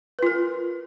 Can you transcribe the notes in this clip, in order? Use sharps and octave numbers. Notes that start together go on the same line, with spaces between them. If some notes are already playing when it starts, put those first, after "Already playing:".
F4 A#4 B4